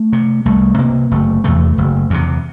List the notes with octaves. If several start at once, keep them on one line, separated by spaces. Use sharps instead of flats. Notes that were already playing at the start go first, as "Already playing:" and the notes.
Already playing: A3
C3
C2 A3
C3 A#3
F#1 A3
E2 C3 A3
F#1
E2 C3